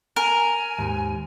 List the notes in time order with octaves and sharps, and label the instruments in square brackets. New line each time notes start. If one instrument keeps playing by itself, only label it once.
[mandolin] A#4 [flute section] G#5
[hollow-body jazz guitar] D#2 G#2